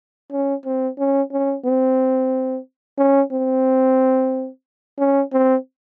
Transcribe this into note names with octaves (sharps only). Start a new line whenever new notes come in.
C#4
C4
C#4
C#4
C4
C#4
C4
C#4
C4